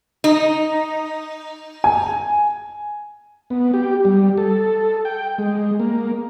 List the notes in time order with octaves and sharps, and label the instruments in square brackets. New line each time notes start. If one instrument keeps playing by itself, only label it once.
[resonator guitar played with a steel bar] D#4
[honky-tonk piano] G#5
[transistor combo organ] B3
G4
G3
A4
G5
G#3
A#3